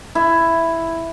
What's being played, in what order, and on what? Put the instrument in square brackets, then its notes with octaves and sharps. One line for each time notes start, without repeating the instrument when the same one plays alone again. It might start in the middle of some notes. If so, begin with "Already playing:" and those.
[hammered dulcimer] E4